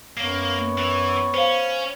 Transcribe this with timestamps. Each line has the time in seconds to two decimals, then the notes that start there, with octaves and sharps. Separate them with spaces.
0.17 F#2 A#3 B3 C#5
0.78 E3
1.34 C#4 C5 F5